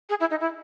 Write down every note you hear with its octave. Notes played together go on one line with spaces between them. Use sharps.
G#4
E4
D#4
E4